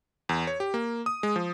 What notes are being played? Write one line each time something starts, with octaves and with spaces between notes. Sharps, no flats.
E2
C#5
G4
A#3
D#6
G#3
F3